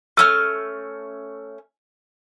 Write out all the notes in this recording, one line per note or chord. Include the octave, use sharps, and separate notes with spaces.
A3 C#4 E6 F6